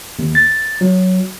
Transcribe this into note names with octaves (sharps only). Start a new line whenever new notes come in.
D#2
A6
F#3